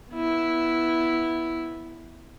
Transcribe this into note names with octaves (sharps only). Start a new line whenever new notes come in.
B3 E4